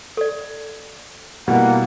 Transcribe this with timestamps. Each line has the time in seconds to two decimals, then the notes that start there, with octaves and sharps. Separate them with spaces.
0.17 A4 D5
1.48 B2 G3 A#3 E4 F#5